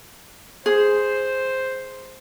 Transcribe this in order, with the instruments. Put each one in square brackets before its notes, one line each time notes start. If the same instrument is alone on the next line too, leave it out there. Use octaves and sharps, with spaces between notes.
[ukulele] G#4 [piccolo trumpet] C5